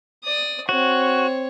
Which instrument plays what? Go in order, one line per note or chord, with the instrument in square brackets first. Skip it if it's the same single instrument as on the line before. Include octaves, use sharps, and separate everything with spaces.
[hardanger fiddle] D5 D#6
[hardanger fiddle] C4 C#5 [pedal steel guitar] F#4